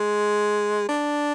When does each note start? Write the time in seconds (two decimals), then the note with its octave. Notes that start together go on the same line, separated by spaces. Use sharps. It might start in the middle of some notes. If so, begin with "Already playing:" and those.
Already playing: G#3
0.89 D4